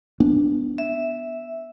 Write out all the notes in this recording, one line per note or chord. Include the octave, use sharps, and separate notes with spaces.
B3 D4
E5